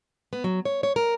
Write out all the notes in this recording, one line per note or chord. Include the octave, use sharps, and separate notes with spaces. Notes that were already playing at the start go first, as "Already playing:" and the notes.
B3
F#3
C#5
C#5
A#4